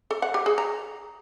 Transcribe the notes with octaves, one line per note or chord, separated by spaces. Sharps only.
A4
F#5
G4
G#4
A#5